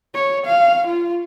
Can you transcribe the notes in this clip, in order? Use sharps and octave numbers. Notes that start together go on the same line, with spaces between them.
C#5
F5
F4